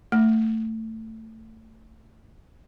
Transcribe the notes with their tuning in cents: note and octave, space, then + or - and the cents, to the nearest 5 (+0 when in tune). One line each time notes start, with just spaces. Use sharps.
A3 +15